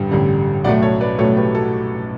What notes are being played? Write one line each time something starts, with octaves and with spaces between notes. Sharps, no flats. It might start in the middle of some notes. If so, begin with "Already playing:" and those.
Already playing: A1 G2 D3 G3
A1 G2 D3 G3
B1 A2 F#3 A3 D5 F#5
A4 C#5
B4 D5
B1 A2 F#3 A3 A4 C#5
G4 B4
F#4 A4